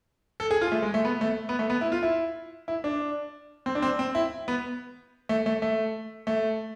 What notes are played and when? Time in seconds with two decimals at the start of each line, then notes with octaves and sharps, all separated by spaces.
0.40 A4
0.51 G#4
0.61 F4
0.72 A3
0.83 G#3
0.94 A3
1.05 B3
1.21 A3
1.49 B3
1.59 A3
1.70 B3
1.81 E4
1.92 F4
2.03 E4
2.68 E4
2.84 D4
3.66 C4
3.75 D4
3.82 C4
3.99 C4
4.15 E4
4.48 B3
5.29 A3
5.46 A3
5.62 A3
6.27 A3